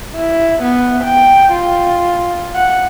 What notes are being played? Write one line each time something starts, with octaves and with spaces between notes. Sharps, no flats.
E4
B3
G5
F4
F#5